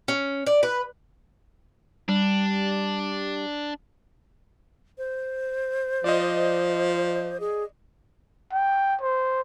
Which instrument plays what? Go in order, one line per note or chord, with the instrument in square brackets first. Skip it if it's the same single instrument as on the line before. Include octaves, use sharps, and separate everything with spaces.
[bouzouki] C#4
D5
B4
[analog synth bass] G3 [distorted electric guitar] D4
[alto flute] C5
[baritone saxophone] F3 [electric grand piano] D5 D#5
[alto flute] G#4
[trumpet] G5
C5